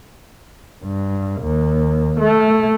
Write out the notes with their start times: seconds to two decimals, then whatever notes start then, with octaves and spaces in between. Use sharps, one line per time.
0.84 G2
1.41 D#2
2.19 A3